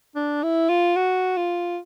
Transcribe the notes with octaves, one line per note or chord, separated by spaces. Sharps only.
D4
E4
F4
F#4
F4